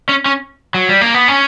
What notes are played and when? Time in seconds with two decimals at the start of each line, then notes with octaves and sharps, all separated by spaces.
0.09 C#4
0.26 C#4
0.74 F#3
0.89 G3
1.01 A#3
1.14 B3
1.28 C#4